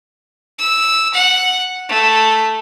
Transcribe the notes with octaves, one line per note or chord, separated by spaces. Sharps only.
E6
F#5
A3